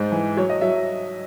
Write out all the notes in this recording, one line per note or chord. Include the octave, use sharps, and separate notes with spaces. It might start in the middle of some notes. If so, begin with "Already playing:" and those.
Already playing: G#2 C5
E3
F#3 C#5
D#5
F#3 E5